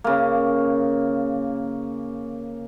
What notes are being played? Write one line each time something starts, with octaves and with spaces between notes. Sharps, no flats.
C#3 A#3